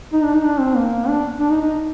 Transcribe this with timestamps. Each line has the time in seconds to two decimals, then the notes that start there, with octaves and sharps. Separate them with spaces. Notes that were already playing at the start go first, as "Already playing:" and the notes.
0.13 D#4
0.23 D4
0.34 D#4
0.44 D4
0.60 C4
0.76 A#3
1.08 D4
1.39 D4
1.50 D#4
1.61 D#4